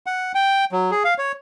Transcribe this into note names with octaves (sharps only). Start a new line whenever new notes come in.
F#5
G5
F#3
G#4
F5
C#5